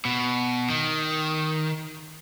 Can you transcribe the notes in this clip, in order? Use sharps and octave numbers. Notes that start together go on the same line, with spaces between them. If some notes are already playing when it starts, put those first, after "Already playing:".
B2
D#3